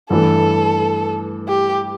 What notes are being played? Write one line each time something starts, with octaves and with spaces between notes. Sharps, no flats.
G2 E3 A3 A4
G4